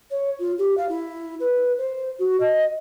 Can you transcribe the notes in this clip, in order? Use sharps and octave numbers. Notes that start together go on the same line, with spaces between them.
C#5
F4
G4
F5
E4
B4
C5
F#4
D#5